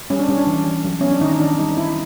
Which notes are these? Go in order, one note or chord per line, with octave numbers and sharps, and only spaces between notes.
G3 C#4
D4
G3 C#4
D4
E3
E3
F#3
B3 C#4
D4
D#3 D#4
D#4
D#3 D4
G3 D#4
C4 E4